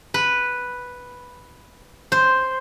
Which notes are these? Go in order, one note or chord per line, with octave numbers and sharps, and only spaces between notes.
B4
C5